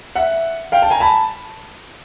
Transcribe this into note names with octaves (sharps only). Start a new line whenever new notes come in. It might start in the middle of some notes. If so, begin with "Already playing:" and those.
E5 F#5
F5 G5
G5 A5
G#5 A#5
A5 B5